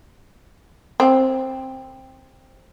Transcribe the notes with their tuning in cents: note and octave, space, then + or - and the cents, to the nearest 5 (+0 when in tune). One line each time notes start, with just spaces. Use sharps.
C4 +10